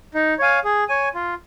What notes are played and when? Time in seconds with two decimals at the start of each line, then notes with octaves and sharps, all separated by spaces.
0.14 D#4
0.39 C#5 F5 G#5
0.64 G#4
0.89 C#5 G#5
1.14 F4